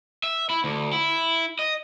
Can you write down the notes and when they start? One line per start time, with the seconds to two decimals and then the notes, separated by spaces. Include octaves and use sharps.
0.24 E5
0.50 E4
0.64 D2
0.93 E4
1.59 D#5